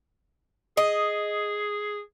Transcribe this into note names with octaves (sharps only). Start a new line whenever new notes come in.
G#4 D#5